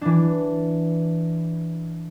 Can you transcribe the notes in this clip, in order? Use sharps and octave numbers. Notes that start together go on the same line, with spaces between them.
E3 D4